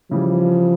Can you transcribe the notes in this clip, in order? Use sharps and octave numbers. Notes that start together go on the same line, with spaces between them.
C#3 E3 F3 G3